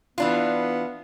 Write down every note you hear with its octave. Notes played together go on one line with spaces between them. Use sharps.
E3 B3 D4 F4